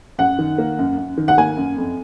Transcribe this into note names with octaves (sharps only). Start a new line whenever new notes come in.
F#2 F#5
D#3
A#3
F#2
F#2
D#3
F#5
A#3 G#5
F#2
F2